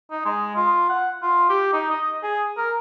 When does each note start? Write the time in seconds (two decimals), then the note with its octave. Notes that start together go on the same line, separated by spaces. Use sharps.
0.11 D#4
0.25 G#3
0.56 F4
0.89 F#5
1.23 F4
1.49 G4
1.73 D#4
1.91 D#5
2.23 G#4
2.58 A#4